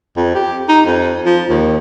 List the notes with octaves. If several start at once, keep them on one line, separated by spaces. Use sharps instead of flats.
F2
G4
D#4
F2
F3
D#2